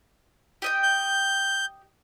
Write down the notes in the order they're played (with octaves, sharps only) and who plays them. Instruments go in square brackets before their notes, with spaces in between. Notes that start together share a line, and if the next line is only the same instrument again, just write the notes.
[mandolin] G4 D#5 G5
[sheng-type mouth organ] G6